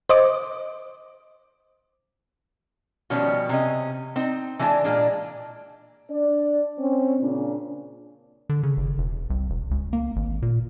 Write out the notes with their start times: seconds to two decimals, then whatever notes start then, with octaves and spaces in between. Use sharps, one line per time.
0.09 C5 D#5 D6
3.10 B2 D#3 F3 G3 C#4
3.49 C3 C#4 D#5
4.16 C4 D#4
4.59 E3 G#3 D4 C5 A5
4.84 A#2 G#3 D4
6.11 D4 D5
6.79 C4 C#4
7.20 A#2 C#3 D4
8.49 D3
8.63 C#3
8.77 G1
8.98 E1
9.30 C2
9.50 E1
9.71 C#2
9.93 A#3
10.16 G#1
10.42 A#2